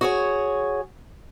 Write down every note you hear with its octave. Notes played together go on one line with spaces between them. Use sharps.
F#4 G#4 C#5